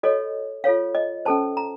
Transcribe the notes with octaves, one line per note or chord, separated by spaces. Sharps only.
F#4 A4 C#5 D#5
F4 A4 C#5 F5
D#5
C#4 A4 C5 A5
A#5